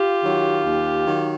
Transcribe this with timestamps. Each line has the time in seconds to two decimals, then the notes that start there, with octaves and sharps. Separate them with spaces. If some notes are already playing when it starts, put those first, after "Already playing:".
Already playing: F4 G4
0.21 D#3 F#3
0.62 D#2
1.04 D#3 F#3